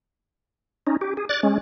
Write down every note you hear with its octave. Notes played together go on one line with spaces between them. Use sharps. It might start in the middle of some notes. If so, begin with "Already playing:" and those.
C#4 D#4
G4
G#4
D5 F#6 A6
G#3 C#4